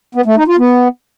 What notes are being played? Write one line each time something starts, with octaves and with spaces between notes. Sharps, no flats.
B3
A3
D#4
F4
B3